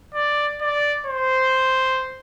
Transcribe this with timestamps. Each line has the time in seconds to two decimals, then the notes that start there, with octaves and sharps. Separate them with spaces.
0.14 D5
0.61 D5
1.06 C5